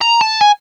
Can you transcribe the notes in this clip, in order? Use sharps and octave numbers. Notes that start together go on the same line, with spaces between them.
A#5
A5
G#5